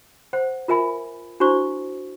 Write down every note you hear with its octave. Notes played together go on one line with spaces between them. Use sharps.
C5 F#5
F4 A#4 E5 G#5 B5
D4 E4 F#4 C5 C#6